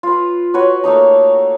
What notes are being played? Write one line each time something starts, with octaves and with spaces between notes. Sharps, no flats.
F4 B4
F#4 B4 C#5
A3 A#3 D#4 A#5